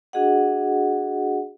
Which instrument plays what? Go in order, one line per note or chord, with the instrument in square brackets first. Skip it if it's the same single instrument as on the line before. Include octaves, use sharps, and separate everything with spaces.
[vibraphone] D4 F#4 G#4 D#5 F#5